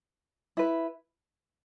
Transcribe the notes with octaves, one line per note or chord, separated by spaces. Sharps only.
E4 B4